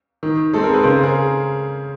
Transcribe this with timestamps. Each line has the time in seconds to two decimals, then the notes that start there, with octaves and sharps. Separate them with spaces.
0.23 D#3
0.53 G#3 C4 A4
0.63 A#4
0.73 B4
0.83 C#3 A#4 C5
1.03 G#4 A#4